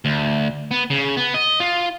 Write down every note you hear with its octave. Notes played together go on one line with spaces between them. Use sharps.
D2
B3
C#3
B3
D#5
F4